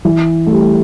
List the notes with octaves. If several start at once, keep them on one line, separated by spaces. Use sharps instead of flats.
E3
A3
G3